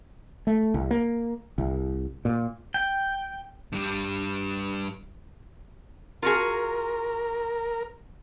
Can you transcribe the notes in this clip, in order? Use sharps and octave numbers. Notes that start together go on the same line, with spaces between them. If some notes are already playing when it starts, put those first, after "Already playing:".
A3
C2
A#3
C2
A#2
G5
G2 G3
F4 F#4 G#4 A#4